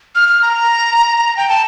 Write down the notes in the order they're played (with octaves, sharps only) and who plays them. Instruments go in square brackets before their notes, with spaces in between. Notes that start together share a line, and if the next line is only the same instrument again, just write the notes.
[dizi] F6
F6
A#5
G5
A5